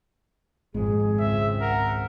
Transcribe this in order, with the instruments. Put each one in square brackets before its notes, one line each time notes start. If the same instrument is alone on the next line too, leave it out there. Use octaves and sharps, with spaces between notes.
[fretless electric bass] G#1 G#3 [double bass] F2 A#2 [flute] G#4
[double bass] C#2 C4 [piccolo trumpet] E5
[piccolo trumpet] A#4 [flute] F#5